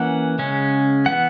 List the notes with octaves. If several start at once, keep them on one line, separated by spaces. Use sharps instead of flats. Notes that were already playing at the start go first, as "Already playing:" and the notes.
Already playing: E3 A#3 C#4 F#5
C#3 G#3 C#4
E3 B3 F#5